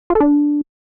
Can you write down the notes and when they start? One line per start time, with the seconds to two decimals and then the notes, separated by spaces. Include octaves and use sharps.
0.10 F4
0.15 A4
0.20 D4